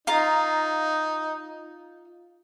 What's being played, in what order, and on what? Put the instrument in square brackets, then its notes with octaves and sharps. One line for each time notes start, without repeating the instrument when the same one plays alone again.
[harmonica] D#4 [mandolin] F4 F5 A#5